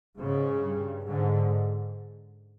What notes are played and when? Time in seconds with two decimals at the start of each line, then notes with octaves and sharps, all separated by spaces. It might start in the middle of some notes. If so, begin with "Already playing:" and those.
0.19 G#2 C#3
0.63 G2
1.07 G#2 D3